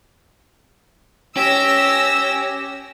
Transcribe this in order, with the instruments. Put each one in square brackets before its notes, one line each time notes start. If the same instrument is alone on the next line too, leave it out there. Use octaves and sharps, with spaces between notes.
[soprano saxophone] C#4 [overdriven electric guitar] G4 [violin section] E6 A#6